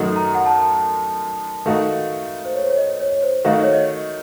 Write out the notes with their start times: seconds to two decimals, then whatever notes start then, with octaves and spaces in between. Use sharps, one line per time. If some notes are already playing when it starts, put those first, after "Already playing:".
Already playing: F#2 D#3 A3 D#4 F#4
0.16 A#5
0.35 F#5
0.46 A5
1.66 D#3 A3 D#4 F#4 F5
2.45 C5
2.55 C#5
2.63 C5
2.70 C#5
2.78 D#5
3.00 C#5
3.23 C5
3.45 D#3 A3 D#4 F#4 F5
3.54 D#5
3.63 C#5
3.73 D#5